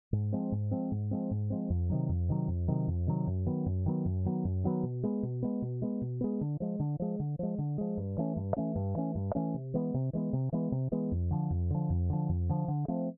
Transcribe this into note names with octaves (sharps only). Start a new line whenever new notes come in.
G#2
F3 G#3 C4
G#2
F3 G#3 C4
G#2
F3 G#3 C4
G#2
F3 G#3 C4
F2
C3 D#3 F#3
F2
C3 D#3 F#3
F2
C3 D#3 F#3
F2
C3 D#3 F#3
F#2
D#3 F#3 B3
F#2
D#3 F#3 B3
F#2
D#3 F#3 B3
F#2
D#3 F#3 B3
B2
G#3 B3
B2
G#3 B3
B2
G#3 B3
B2
G#3 B3
D3
F3 G#3
D3
F3 G#3
D3
F3 G#3
D3
F3 G#3
G2
E3 A3 C#4
G2
E3 A3 C#4
G2
E3 A3 C#4
G2
E3 A3 C#4
C3
E3 G#3 B3
C3
E3 G#3 B3
C3
E3 G#3 B3
C3
E3 G#3 B3
F2
D3 F3
F2
D3 F3
F2
D3 F3
F2
D3 F3
D3
F3 A3 C4